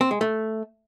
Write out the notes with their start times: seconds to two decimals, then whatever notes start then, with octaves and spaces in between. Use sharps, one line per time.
0.01 C4
0.11 G#3
0.21 A3